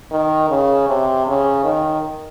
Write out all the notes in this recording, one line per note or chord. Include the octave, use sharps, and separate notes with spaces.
D#3
C#3
C3
C#3
D#3